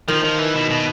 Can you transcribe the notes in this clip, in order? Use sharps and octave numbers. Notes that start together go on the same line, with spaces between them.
D#3 F3
F3
E3
B2
B2